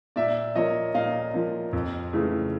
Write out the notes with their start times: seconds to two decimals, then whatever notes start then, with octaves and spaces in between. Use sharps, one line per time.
0.16 A#2 D5 E5
0.55 F3 A#3 C#5 D#5
0.94 A#2 D#5 F5
1.34 F3 A#3
1.73 F2
2.13 C#3 E3 A3